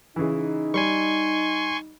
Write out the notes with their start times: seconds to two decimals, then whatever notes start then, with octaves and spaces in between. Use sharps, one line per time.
0.16 C#3 E3 D#4
0.74 G3 G#5 C6 C#6